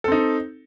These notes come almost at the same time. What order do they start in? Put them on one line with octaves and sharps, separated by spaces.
A4 C4 D#4